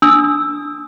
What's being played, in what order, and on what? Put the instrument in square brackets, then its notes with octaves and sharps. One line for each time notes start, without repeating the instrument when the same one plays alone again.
[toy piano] D4 D#6 E6